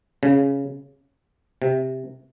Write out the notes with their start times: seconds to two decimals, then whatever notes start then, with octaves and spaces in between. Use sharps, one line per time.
0.23 C#3
1.62 C3